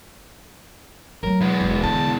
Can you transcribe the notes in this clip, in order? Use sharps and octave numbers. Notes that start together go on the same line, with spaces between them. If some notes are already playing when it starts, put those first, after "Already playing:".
F#3 A3 A#4
E2 G#3 B3
E1
D3 B3 A5